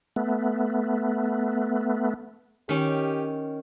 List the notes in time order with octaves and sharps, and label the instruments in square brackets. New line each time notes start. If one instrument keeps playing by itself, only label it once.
[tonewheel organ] A3 B3
[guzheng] D#3 C#4 [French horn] G4